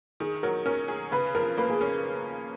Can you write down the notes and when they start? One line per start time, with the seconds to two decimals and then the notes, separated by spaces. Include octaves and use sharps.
0.20 D#3 G#4
0.43 F#3 A#4
0.66 C#4 A#4
0.88 G#4
1.12 C#3 B4
1.35 F3 A#4
1.58 A#3 B4
1.70 G#4
1.81 C#4 A#4